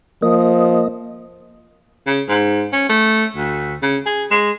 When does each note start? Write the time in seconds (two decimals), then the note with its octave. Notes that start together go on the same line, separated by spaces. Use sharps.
0.22 F3 A#3 D#5
2.07 C#3
2.29 G#2
2.73 C#4
2.89 A3
3.36 D2
3.83 C#3
4.06 G#4
4.31 G#3